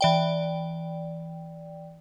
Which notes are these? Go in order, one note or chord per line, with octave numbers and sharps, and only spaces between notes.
E3 D5 G5